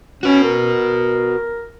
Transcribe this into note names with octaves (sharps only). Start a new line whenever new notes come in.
C#4 F#4 B4
A#4